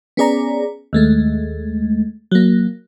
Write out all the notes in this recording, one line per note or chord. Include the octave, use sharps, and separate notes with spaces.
B3 C#4 G#4 D5 A#5
D#2 G#3 A3
F#3 A#3